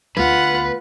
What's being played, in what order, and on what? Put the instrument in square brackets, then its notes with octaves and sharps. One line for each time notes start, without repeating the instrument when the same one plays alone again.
[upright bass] D2 B3 [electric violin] F4 F#5 [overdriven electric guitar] B4